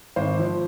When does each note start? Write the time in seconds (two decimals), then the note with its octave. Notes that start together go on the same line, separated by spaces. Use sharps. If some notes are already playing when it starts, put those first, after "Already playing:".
0.16 G#1 C5
0.39 F3